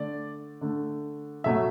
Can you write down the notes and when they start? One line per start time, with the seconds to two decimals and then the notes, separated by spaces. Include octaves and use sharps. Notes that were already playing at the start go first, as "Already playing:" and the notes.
Already playing: D3 A3 D5
0.61 D3 A3
1.44 B2 F#3 A3 E5